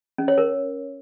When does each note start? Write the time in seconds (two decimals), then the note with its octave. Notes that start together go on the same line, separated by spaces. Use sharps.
0.18 C#4
0.28 C#5
0.38 A#4